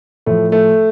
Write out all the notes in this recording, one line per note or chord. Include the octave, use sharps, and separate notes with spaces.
A2 F3 A3
A3